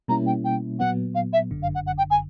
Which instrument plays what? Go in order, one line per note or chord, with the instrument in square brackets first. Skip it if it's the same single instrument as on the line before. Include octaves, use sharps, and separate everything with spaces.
[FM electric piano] B2 G3 A#3 C#4 E4 [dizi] A#5
[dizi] G5
G5
[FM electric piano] A#2 F#3 B3 [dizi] F#5
[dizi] F5
E5
[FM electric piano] G1 F#2 D3
[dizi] F5
F#5
F#5
G5
G#5